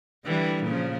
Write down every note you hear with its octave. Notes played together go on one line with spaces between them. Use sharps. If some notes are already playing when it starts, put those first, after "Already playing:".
D3 E3 G3
A#2 C#3 F3